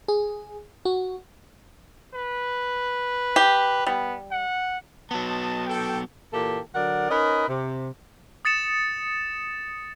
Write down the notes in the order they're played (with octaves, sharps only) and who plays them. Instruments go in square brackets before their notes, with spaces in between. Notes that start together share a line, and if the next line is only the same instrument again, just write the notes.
[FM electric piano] G#4
F#4
[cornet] B4
[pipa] G4
[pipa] G3 [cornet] B3
[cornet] F#5
[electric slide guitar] F#3 B3 [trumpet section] F#4 D#5 A5
[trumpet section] A4 G5
[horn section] A#2 E3 A#3 G4 A4
D3 F#3 A#4 D5 F#5
C#4 D#4 A#4 B4 D#5
C3
[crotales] D#6 A6 C#7 E7